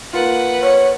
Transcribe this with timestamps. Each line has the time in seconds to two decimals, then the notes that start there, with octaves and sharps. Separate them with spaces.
0.13 A#3 F4 B4 F#5
0.62 C#5